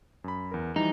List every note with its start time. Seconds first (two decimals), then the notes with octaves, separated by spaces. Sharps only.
0.24 F#2 B5
0.52 E2 A#4
0.76 E3 F3 G3 D#4